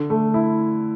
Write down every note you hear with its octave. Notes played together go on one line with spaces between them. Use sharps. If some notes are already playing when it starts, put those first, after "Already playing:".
Already playing: D3
A3
E4